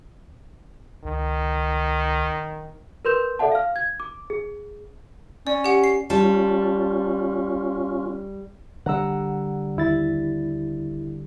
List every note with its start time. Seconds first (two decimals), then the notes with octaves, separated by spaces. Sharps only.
1.04 C#2 D#3
3.05 A#4 B4 C6 G6 E7
3.39 A4 D5 E5 F#5 A5
3.52 F5 F6
3.76 G#6
4.00 D6
4.30 G#4
5.47 C#4 D5
5.64 G4 F#5
5.84 C7
6.10 G3 C#4 F4 A5
8.86 D3 G3 F#5 A#5 E6
9.77 D#2 E4 A6